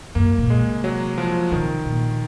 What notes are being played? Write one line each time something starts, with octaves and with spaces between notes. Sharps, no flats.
F#2 A#3
A#2
G#3
C3
F#3
F3
C3 D#3
A#2